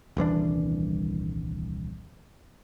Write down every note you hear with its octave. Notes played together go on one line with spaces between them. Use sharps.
D#1 C2 E3 D4